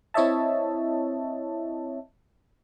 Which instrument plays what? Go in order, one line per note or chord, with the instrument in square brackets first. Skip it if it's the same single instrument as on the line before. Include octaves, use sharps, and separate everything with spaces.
[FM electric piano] C4 E4 C#5 D#5 E5 A5